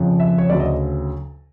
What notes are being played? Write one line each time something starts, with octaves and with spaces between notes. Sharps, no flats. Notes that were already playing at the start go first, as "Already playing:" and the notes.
Already playing: F2 C#3 F3
E5
C#5
D2 C#3 F#3 D5
D#5